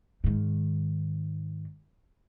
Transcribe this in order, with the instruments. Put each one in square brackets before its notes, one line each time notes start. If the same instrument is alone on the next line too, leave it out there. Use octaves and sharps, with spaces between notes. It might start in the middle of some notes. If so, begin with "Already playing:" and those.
[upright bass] G#2 D#3